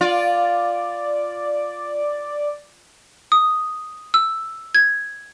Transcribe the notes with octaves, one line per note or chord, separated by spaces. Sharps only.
F4 D5
D#6
E6
G#6